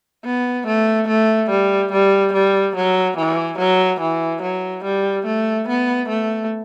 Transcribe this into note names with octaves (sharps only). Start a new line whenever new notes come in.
B3
A3
A3
G3
G3
G3
F#3
E3
F#3
E3
F#3
G3
A3
B3
A3